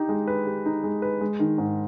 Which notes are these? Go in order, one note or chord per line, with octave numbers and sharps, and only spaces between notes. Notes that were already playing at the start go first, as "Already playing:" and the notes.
Already playing: D#4 G4
G#3
B4
G4
D#4
G#3
B4
G#3
D#3
G#2